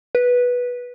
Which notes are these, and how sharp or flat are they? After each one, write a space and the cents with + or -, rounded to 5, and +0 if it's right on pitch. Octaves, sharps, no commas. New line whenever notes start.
B4 -10